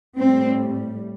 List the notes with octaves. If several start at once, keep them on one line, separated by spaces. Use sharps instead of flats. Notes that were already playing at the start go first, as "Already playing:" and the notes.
A2 G3 C4